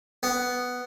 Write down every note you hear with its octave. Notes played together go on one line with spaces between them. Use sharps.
B3